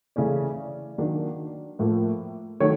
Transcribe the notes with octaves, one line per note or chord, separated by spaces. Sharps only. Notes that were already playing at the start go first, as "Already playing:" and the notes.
C#3 E3 A3 C#4 D5
D#3 F#3 A#3 D4
A2 F3 A#3
D#3 F#3 A3 C#5